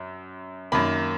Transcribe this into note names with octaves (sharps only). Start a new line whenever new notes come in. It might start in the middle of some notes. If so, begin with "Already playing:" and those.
Already playing: F#2
F#2 D#3 A#3 B5